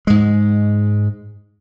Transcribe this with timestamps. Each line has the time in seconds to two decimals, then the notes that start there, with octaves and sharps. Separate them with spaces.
0.07 G#2 G#3